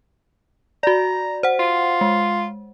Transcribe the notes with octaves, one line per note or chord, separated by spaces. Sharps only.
F#4 D5 A#5
C5 F#5
F4
G#3